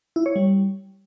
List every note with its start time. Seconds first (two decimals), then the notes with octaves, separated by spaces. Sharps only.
0.16 E4
0.26 C#5
0.36 G3